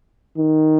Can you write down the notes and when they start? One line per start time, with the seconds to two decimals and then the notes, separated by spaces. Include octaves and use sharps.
0.38 D#3